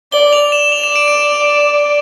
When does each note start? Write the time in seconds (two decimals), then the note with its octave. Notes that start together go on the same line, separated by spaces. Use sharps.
0.12 D5 G7
0.33 F7
0.52 E7
0.72 D5 F7
0.84 E7
0.96 D7
1.08 E7